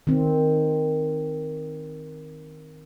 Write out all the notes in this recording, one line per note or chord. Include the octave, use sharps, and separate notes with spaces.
D#3 C4